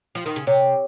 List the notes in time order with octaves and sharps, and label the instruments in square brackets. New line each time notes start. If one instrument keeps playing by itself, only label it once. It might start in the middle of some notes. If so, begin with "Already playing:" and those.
[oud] F3
D#3
C#3
[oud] C3 [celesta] C#5